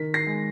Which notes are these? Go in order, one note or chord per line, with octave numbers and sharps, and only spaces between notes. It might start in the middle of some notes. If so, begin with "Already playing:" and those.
Already playing: D#3 B6
A#6 C7
G#3